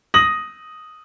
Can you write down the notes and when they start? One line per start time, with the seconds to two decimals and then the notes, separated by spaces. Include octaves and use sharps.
0.14 D#6 A#6 F#7